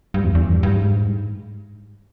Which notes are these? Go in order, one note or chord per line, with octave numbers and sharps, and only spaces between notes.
G2
E2
E2
G2
G2
G#2